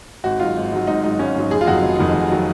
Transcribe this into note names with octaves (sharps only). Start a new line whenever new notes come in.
G#1 F#4
G#2 F#3 F4
G#1
G#2 F#3
G#1 D#4
G#2 F#3 D#4
G#1 C#4
G#2 F#3
F1 G#4
F4
F2 D#3 F#3 F#4
F1
F2 D#3 F#3
F1
D#3 F#3